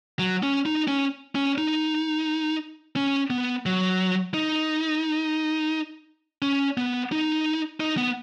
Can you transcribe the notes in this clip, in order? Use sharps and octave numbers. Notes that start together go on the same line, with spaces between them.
F#3
C#4
D#4
C#4
C#4
D#4
C#4
B3
F#3
D#4
C#4
B3
D#4
D#4
B3